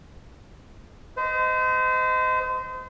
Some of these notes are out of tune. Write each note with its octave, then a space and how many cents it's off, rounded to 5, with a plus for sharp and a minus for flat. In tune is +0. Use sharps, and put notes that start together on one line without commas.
C5 -35 D#5 +10